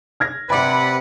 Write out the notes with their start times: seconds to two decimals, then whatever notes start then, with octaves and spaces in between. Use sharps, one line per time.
0.20 F6 G#6 A#6
0.50 C3 B4 D5 F#5 B5 D6